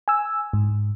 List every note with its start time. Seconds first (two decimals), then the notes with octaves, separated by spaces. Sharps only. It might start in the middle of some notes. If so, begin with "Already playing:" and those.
0.08 G#5 E6
0.53 G#2